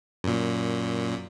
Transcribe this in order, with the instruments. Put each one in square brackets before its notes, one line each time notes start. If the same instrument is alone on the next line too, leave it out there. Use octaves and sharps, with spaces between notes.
[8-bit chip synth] F#2 A#2